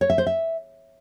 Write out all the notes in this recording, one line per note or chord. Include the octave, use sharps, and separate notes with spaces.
C#5
E5
C5
E5